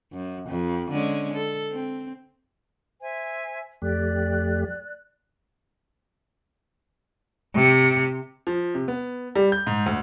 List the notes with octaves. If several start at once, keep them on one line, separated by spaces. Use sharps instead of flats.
F#2
F2
D3 G#3 C#4
A4
C4
C5 E5 G#5
F2 A3 G4 D5 F#6
C3
F3
C3
B3
G3
G6
G#2
D2